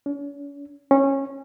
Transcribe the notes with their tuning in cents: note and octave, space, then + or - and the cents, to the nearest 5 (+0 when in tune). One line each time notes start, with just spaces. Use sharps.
C#4 +40
C#4 -20